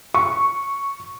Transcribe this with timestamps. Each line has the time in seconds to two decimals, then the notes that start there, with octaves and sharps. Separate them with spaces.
0.14 C#6